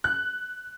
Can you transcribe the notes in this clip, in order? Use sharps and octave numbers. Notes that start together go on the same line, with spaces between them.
F#6